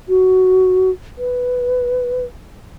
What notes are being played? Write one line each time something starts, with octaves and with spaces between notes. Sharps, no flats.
F#4
B4